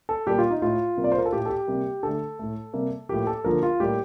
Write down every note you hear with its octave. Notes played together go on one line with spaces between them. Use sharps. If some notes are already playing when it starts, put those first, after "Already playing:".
A4
A#2 G3 A#3 G4
F4
D#4
A2 A3 F4
C3 G3 A#3
D5
C5
A#4
A4
A2 A3 G4
A4
G4
C3 G3 A#3
D3 A3 A4
A2 A3
C3 G3 A#3
A2 F3 A#3 G4
A4
D3 F3 A#3 A#4
F4
A2 G3 A#3 G4